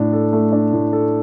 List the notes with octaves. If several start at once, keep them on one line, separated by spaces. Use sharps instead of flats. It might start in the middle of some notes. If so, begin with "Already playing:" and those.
Already playing: A2 D4
A4
A3
D4
A2
A4